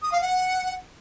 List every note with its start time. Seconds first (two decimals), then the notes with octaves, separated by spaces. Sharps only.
0.02 D#6
0.12 F5
0.21 F#5